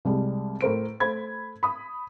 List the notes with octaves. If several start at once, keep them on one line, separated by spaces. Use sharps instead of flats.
C2 G3 G#3
A2 A#4 C5 D7
A3 C5 B5 G#6
B5 D#6